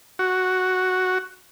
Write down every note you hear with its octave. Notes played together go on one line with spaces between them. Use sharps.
F#4